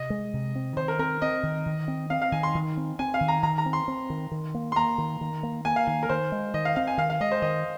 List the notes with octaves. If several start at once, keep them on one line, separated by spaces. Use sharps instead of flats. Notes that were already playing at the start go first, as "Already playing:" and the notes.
Already playing: C3 D#5
G#3
C3
C4
D#3 C5
A#4
C4 A#4
C4 D#5
D#3
D#3
C4
C4 F5
F5
D#3 G#5
C6
D#3
C4
C4 G#5
F5
D#3
A#5
D#3 A#5
A#5
C4
C6
C4
D#3
D#3
A#3
C6
A#3 A#5
D#3
D#3
A#3
A#3 G#5
F5
D#3 G#5
A#4
D#3 C5
G#3
D#3 D#5
F5
C4 F5
G#5
D#3 F5
F5
G#3 D#5
C5
D#3 D#5